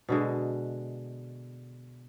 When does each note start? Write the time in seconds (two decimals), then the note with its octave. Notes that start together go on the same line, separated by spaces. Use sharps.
0.09 B2 D3 G#3